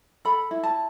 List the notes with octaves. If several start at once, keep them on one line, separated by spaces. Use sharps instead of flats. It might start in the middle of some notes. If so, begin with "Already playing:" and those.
A4 B5
E4
A5